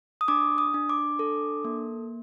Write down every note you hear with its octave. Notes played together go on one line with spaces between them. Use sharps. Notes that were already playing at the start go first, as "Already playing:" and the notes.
D#6
D4 D6
D#6
D4
D6
A4
A#3